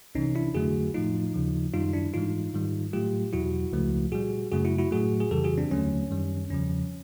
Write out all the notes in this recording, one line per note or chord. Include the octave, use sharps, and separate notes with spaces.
C2 C3 E3 C#4 D#4
D4 E4
F2 D3 F#3 A3 F#4 G#4
A2 F3 A3 D#4 F4
D#2 C#3 F3
F#2 D#3 G3 D#4 F4
D4 E4
G#2 E3 G#3 D#4 F4
G#2 D#3 G3
A2 F#3 A3 F4 G4
E2 B2 F#3 E4 F#4
C#2 C#3 F3 A3
A#2 G3 F#4 G#4
F#2 C#3 F#3 A3 F#4 G#4
E4 F#4
E4 F#4
A2 F#3 A3 F#4 G#4
G#4
F2 C#3 E3 G3 G4 A4
F#4 G#4
C4 D4
D#2 D3 F#3 A3 C#4
F#2 D#3 G3
E2 C#3 F3 C#4